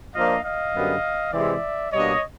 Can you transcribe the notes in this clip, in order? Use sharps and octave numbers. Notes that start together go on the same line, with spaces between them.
F3 A#3 D4 F4 D#5 F5
D#5 F5
F#2 D3 G3 B3
C3 E3 G#3 C4 E4 D5 E5
B2 G3 A#3 D4 C#5 D#5